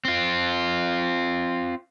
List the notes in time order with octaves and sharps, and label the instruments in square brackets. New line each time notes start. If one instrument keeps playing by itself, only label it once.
[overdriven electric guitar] C4 F4